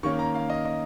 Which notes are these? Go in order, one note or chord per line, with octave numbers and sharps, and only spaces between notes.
D#3 A#3 C#4 C#6
A#5
F5
D#5
D#5